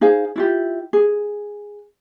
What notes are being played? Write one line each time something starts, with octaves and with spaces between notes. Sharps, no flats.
D#4 G#4 C5 F5
E4 F4 G4
G#4